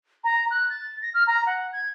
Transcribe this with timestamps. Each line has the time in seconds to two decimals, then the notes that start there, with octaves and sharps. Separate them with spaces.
0.24 A#5
0.51 F#6
0.70 A6
1.02 A#6
1.14 F6
1.27 A#5
1.46 F#5
1.73 G#6